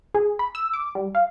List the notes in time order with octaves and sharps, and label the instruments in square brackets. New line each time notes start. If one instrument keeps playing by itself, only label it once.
[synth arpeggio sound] G#4
B5
E6
D6
G3
F5